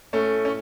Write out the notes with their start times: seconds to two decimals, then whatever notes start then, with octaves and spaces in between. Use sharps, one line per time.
0.13 A2 A3 C#4
0.45 C#4